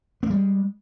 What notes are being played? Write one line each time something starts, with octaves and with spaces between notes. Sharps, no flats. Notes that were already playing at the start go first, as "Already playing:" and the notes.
G3 G#3 A#3 B3